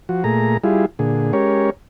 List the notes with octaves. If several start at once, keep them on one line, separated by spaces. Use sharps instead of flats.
F3 F#4
A#2 A3 G#4 A#5
G3 E4 F4 G#4
A#2 D3 G#4
G#3 C#4 G4 A#4 C#5